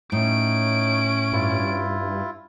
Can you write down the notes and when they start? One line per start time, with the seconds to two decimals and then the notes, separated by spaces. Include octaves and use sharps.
0.12 A2 C#4 D#4 D7
1.33 G2 E4 F4